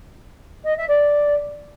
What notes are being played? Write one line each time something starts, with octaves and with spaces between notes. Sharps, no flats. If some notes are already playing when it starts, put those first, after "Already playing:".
D#5
E5
D5